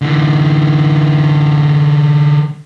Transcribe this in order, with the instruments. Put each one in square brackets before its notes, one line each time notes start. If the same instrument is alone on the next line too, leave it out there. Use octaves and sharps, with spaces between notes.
[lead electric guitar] D3 E3